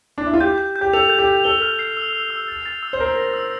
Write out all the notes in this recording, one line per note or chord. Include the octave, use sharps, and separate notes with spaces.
D4
E4
F4
G4 G6
G6
G6
G4
A4 F7
G6
G4
G6
A4 G7
F6
C7
E6
E6
E6
A6
A6
E6
C5
A#4 E6
A#6
E6